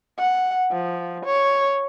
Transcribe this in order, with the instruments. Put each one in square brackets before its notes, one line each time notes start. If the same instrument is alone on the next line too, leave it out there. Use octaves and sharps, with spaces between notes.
[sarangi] F#5
F3
C#5